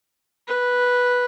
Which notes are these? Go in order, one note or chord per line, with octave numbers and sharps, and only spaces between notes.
B4